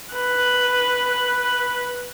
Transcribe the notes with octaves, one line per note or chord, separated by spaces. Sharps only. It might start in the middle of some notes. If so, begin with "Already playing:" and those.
B4 F#6